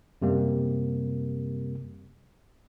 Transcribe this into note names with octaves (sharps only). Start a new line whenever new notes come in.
F#2 C3 G3 A#3